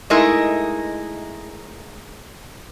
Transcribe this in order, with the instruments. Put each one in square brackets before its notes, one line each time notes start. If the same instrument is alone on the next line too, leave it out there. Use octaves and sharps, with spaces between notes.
[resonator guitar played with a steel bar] G#3 A3 D#4 E4 A#4